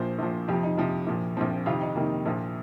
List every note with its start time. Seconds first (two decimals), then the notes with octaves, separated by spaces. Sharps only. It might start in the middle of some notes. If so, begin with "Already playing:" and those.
Already playing: A#1 A#2 F3 C5
0.19 A#1 A#2 F3
0.48 F2 C3 F3 G4
0.63 D#4
0.77 F2 C3 F3
1.07 A#1 A#2 F3
1.36 A#1 A#2 F3 C4
1.66 F2 C3 D#3 F4
1.81 D#4
1.96 F2 C3 D#3 A#3
2.25 A#1 A#2 F3